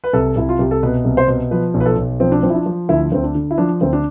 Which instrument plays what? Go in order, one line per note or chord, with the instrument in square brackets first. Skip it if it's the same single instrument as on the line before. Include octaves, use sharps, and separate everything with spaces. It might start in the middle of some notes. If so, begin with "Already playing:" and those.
[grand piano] B4
C2 A4
C2 E4
F4
C2 G4
A4
B2 B4
C2
C5
B2
F3 B4
B1
B4
A4
B1
F3 C4
D4
F3 C4
E4
D4
F3
D2 E4
D2 C4
D4
D3
E4
F3 D4
D2 C4
D4